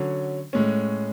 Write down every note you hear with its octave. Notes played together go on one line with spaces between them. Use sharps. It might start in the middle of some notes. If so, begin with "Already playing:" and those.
Already playing: D3 F#3 C#4
A2 G#3 C#4